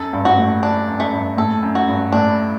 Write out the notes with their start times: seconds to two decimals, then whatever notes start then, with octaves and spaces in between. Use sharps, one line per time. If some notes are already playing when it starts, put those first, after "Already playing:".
Already playing: F#2 A4
0.13 G2
0.25 G2 F#4
0.38 A2
0.63 D4
0.88 F#2
1.00 A3
1.13 G2
1.37 A2 A4
1.63 F#2
1.75 F#4
1.88 G2
2.12 A2 D4